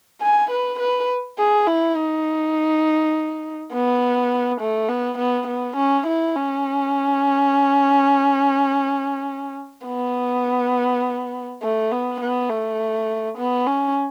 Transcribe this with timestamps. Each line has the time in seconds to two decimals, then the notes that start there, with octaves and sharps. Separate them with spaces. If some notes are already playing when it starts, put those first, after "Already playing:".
0.21 G#5
0.51 B4
0.79 B4
1.38 G#4
1.67 E4
1.97 D#4
3.73 B3
4.61 A3
4.89 B3
5.18 B3
5.47 B3
5.76 C#4
6.06 E4
6.36 C#4
9.87 B3
11.62 A3
11.92 B3
12.21 B3
12.50 A3
13.38 B3
13.67 C#4